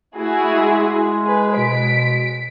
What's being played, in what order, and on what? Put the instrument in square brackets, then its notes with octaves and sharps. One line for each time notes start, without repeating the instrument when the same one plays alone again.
[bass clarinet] A3 [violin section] E4 F#4 G#4
[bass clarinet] G#3
[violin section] G#4 B4
[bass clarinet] B2 [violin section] B6 D7